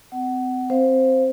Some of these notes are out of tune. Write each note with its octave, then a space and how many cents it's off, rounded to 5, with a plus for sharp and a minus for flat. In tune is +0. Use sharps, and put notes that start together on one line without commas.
C4 -30 F#5 +20
C4 +0 C5 +0 F5 +0